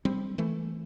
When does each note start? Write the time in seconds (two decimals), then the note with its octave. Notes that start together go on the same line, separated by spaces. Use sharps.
0.05 G3 C4
0.38 E3 A3